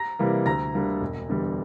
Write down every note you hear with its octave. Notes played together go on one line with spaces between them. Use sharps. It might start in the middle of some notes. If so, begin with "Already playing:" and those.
Already playing: A#5 A#6
C3 E3 G3 A#3
D2 A#5 A#6
D3 G3 A#3 D4
E1
E2 D3 G3